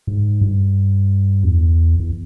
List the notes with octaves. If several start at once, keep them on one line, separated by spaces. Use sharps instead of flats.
G#2
G2
E2
E2